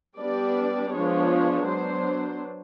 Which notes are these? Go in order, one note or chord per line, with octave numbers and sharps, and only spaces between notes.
G3 B3 D4 D5
F3 G#3 B3 D4 C#5
F#3 B3 D4 C5